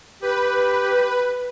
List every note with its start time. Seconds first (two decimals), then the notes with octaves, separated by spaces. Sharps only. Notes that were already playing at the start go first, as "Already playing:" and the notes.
0.22 G4 B4